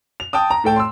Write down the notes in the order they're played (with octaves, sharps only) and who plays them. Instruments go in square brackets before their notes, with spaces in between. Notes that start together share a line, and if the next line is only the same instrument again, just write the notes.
[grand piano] F7
G5 A5 D#6
A#5
A2 A4 G5 A5
C6 E6